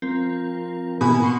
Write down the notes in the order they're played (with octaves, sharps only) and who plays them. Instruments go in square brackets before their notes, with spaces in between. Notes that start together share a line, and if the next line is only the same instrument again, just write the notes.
[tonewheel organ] F3 A#4 [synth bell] C4
[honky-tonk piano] B2 [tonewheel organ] D#3 E3 A#3 [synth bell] G#5 B5
[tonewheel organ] F#5 C6 C#6